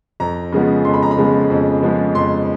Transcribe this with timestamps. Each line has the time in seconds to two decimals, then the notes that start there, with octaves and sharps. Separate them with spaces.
0.20 F2 A#5
0.52 C#3 F3 G#3 B3
0.85 F2 C6
0.94 B5
1.02 A#5
1.11 B5
1.17 C#3 F3 G#3 B3
1.50 F2
1.82 C#3 F3 G#3 B3
2.15 F2 C6